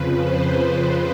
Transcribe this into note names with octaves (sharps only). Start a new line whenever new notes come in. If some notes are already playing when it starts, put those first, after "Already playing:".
Already playing: F2 C#3 F3 B4
C5